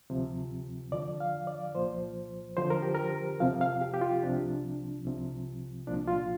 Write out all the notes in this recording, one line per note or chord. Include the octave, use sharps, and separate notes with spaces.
D2 C3 F3
F2 D3 F3 D5
F5
D5
C2 A#2 F3 C5
F2 D3 F3 C5
A#4
G4
A#4
F2 C3 F3 F5
F5
G4
G4
F4
C2 C3 F3 D4
C2 C3 F3
C2 A#2 F3 D4
F4